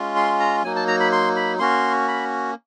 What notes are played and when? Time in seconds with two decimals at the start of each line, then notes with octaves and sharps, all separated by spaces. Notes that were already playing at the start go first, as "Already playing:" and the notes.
Already playing: G#3 C#4 F4
0.16 C6
0.40 A#5
0.63 F#3 A#3 D#4 G#5
0.76 A5
0.88 A#5
1.00 B5
1.12 C6
1.36 B5
1.59 A#3 C#4 F#4 C6
2.08 B5